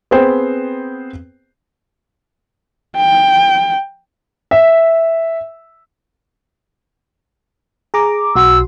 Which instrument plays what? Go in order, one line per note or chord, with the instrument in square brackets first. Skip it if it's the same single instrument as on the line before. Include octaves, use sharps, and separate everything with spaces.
[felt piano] B3 C4 G#4 C5 G5
[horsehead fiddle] G5
[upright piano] E5
[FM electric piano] G#4 A#5 D6
[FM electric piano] B1 F#4 C6 [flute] E6